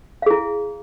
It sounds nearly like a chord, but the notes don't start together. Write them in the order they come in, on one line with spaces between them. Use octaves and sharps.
F5 G#4 E4